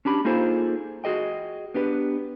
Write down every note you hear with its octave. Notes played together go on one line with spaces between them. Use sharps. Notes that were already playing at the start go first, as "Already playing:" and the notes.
C#4 D4 G4 B5
A#3 D#4 F4 G#4 A4 C5
F#4 G#4 D#5 G5
B3 D4 G4 B4